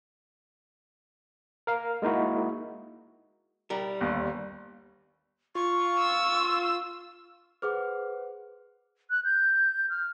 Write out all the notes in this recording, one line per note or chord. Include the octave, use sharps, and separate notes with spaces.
A#4 F5
G#3 A#3 D#4 E4 F#4
G3 A#4
G1 D#2
F4 C#6
E6
G#4 B4 C5 F#5 D6 F6
F#6
G6
F6